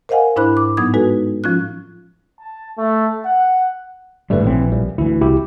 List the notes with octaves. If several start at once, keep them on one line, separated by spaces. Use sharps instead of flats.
A#4 C5 D#5 F5 F#5 G#5
G#2 D4 E4 C5 B5 F#6
D6
A2 F#3 B3 D#4 D#6 G#6
G#3 D#4 F#4 A4 B4
F3 C#4 F4 F#6
A5
A3
F#5
F#1 G#2 D3 G3 A3 B4
A#1 E3 F#3 C4
C2 F3 G3
D2 E3 E4
C2 E4 F#4 G4